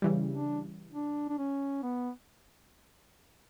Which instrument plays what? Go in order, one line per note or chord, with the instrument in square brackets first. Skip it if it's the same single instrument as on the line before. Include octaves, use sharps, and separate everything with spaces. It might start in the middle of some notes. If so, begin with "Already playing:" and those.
[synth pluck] C#3 E3 G3
[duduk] D4
D4
D4
C#4
B3